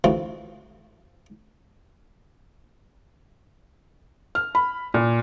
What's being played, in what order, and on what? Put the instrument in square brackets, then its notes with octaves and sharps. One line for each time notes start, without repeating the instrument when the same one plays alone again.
[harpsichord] D2 C3 E3 C4 F4 F#4
[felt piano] F6
B5
A#2